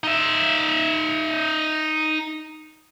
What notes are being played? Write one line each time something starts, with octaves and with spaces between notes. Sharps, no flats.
D#4 E5